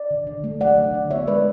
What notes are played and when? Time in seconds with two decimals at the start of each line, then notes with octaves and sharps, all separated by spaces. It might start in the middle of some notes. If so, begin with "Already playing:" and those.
Already playing: D5
0.11 D3
0.27 D3
0.44 A3
0.61 F#3 D5 F#5
0.77 D3
0.94 D3
1.10 B3 C#5 E5
1.27 G#3 B4 D5